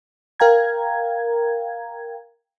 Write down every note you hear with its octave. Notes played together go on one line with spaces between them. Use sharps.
A#4 F5 G5 A#5 G#6